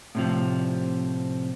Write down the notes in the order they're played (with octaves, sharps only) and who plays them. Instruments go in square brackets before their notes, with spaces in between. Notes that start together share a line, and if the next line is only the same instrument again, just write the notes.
[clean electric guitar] A2 C3 F3